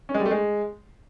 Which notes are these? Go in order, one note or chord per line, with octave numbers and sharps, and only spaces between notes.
C#4
G#3
G3
A3
G#3